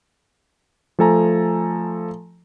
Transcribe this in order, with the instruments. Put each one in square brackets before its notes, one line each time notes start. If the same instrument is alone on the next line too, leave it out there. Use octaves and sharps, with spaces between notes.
[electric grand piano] F3 A3 A4 G#5 A#5